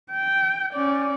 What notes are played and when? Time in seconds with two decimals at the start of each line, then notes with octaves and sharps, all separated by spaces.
0.11 G5
0.74 C#4 D5